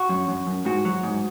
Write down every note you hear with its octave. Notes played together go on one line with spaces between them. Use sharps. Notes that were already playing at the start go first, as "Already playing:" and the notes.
Already playing: F#4
F#2
F#2
F#2
G#2 F#4
F#3
G#2